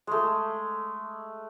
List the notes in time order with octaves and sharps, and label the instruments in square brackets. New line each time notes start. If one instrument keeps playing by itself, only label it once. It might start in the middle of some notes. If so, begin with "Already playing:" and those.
[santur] G#3 A3